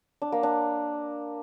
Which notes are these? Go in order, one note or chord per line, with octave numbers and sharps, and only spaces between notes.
D4
A#3
D4